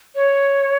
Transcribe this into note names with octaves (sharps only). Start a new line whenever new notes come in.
C#5